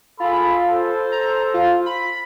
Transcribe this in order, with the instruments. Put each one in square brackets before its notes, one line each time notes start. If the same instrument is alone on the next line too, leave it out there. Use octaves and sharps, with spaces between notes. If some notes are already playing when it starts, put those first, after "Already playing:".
[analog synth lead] F4 [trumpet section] G#4 A4 B5
[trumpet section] A4 C5
[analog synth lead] A#5
F4
B5